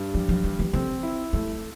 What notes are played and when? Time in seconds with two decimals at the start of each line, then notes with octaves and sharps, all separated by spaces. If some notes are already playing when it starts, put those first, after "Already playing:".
Already playing: G2
0.14 F3 G3
0.29 F3
0.44 E3 G3
0.59 E3
0.73 D3 C4
1.03 E4
1.33 G3 A3